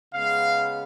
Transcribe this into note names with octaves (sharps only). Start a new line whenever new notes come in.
C#3 G#3 B3 F5